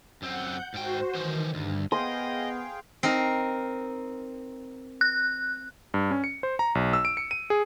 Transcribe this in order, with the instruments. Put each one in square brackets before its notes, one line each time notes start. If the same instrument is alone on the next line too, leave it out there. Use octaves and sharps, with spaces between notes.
[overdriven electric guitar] F#2 C4 [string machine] F#5 G6
[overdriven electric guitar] G#2 G5 [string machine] F#4 C5
[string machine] D#3 [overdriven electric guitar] E3 C5
[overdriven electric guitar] D2 [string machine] G2
[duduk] B3 [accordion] G#4 F5 G5 [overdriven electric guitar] D#5 [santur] C6
[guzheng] C4 D#4 A#4
[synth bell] F#6
[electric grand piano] G2
C#4
C#7
C5
A#5
B1
E6
D7
C#7
D#7
G#4